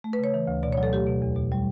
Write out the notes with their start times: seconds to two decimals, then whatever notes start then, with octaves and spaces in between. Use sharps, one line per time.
0.04 A3
0.13 B4
0.19 C#3 C#5
0.34 E3
0.47 D2
0.63 B2 D5
0.73 C#5
0.77 F#3
0.83 A4
0.92 A3 G4
1.07 B2
1.22 E2
1.36 B2
1.52 G3